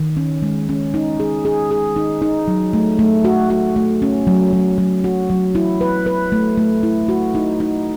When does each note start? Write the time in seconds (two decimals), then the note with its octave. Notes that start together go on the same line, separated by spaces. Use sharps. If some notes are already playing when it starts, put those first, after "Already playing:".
Already playing: D#3
0.17 C#4
0.42 G#3
0.69 C#4
0.94 D#4
1.20 G#4
1.45 G#4
1.71 G#4
1.96 D#4
2.22 D#4
2.48 F#3
2.73 A3
2.99 A3
3.25 F#4
3.50 F#4
3.76 A3
4.02 C#4
4.27 F#3
4.53 F#3
4.78 F#3
5.04 F#4
5.30 F#3
5.55 E4
5.81 B4
6.06 B4
6.32 A3
6.57 A3
6.83 E4
7.08 F#4
7.35 D#4
7.60 D#4